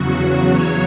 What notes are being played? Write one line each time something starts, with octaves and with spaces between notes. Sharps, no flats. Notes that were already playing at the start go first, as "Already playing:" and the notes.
Already playing: E2 C#3 F#3 F#4
C#5